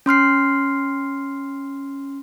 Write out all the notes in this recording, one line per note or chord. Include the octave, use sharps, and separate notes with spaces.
C#4 C6 F6 C7